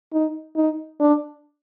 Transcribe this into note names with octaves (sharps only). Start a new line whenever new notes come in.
D#4
D#4
D4